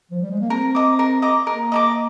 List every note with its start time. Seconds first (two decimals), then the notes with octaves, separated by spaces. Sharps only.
0.11 F3
0.21 G3
0.31 G#3
0.40 A#3
0.50 C4 A#4
0.75 D#5 A#5 D6
0.99 A#4
1.22 D#5 A#5 D6
1.47 A#3 A#4
1.72 D#5 A#5 D6